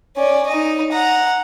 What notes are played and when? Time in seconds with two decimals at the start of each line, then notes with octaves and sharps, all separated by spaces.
0.16 C#4 D5
0.47 D#4 D#5
0.92 F#5 A#5